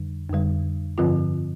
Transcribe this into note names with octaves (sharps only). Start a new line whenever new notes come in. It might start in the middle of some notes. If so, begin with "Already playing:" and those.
Already playing: F2 D3 G3
F2 D3 G3
G2 D3 F3 C4 F4